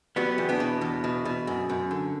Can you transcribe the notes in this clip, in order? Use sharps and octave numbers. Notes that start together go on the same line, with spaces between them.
F#3 G3 B3
E2
B3 D4
B2
E2
B2
B2
F#2
F#2
D3